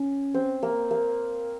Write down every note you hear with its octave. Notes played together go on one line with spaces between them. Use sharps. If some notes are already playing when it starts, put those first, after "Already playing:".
Already playing: C#4
C4
A#3
A#3